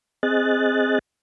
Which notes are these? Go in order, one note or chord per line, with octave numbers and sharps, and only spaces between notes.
C4 G#4 D#5 F#6 A6